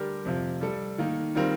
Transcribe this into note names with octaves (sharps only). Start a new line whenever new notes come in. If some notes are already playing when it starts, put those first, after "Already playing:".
Already playing: D3 G3 D4 G4 A#4
F2 C3 F3
G3 D4 A4
D#3 A#3 D#4
D#3 G3 C4 F4 A#4